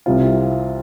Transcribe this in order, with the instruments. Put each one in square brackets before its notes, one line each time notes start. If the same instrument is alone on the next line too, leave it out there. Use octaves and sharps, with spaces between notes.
[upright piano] C2 C3 G3 C4 F4